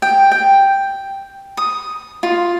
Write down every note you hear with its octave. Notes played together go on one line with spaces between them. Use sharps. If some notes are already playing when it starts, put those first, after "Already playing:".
G5
G5
D#6
F4